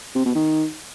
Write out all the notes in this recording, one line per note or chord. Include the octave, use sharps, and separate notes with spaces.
C3
B2
D#3